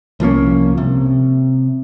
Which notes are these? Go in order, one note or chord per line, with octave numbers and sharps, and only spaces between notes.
C2 F3 A#3 C#4
C3